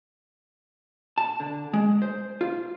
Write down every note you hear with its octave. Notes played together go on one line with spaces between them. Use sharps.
A5
D3
G#3
C5
F4